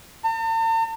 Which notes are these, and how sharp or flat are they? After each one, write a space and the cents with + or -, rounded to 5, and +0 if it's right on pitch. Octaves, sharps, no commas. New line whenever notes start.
A5 +45